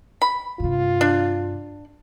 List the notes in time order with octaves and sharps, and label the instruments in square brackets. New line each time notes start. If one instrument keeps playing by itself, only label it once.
[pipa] B5
[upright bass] G2 C3 [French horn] F4
[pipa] D4